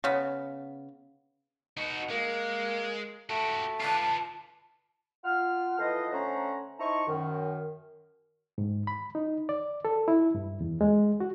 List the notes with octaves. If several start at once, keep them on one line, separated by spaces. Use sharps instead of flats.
C#3 B3
B2 D#4 F#4
G#3 A#3
A3 F#4 G4
F4 B4 A5
F4 F#5 F6
E3 F3 B3 A4 C5 D#5
D3 A3 C#4 C5 F#5 A#5
D#4 E4 C5 A5 A#5 C#6
F#2 D#3
G#2
B5
D#4
D5
A4
E4
G2
E2
G#3
F#4